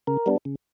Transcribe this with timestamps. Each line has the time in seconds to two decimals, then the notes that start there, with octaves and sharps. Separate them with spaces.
0.07 C#3 A#4
0.26 G3 B3 D4
0.45 C#3